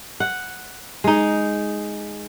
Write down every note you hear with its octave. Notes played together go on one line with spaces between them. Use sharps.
F#5
G#3 D#4